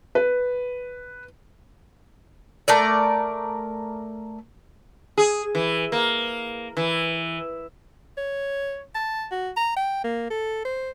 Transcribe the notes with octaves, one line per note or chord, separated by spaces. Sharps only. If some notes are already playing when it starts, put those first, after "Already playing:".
B4
A3 A#4 D5
G#4
E3
A#3
E3
C#5
A5
F#4
A#5
G5
A#3
A4
C5